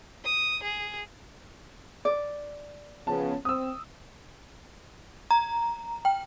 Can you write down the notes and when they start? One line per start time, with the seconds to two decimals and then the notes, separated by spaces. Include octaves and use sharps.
0.25 D#6
0.63 G#4
2.05 D5
3.07 C#3 F3 B3 A5
3.45 C4 D#6 E6
5.31 A#5
6.05 G5